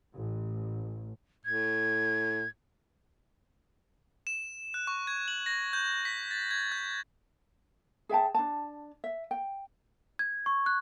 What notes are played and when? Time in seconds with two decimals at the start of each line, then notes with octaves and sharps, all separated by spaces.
0.14 A1
1.45 A2 G#6
4.27 E7
4.74 F#6
4.87 C#6
5.07 G#6
5.28 F#7
5.46 A#6
5.73 G6
6.05 B6
6.31 A6
6.51 G#6
6.72 G6
8.09 G#4 E5 G5 A5
8.34 D4 A5
9.04 E5
9.31 G5
10.19 G#6
10.46 C#6
10.66 F#6